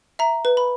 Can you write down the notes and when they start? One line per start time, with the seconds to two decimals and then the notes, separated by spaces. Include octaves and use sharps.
0.19 E5 A#5
0.45 B4
0.57 B5